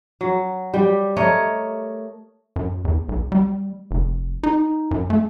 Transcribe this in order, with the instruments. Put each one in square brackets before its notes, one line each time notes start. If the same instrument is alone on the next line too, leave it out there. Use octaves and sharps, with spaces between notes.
[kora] F#3
G3 G4
A3 A#4 C#5 D#5
[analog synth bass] F#2
E2
B1
G3
F1
D#4
F#2
A3